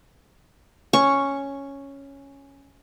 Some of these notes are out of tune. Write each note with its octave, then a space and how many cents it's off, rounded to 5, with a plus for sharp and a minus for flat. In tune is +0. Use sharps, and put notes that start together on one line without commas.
C#4 +0 C#6 +0